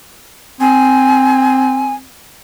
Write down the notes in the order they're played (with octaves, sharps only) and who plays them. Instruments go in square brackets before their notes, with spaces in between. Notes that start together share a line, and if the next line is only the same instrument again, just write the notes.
[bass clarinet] C4 [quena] G#5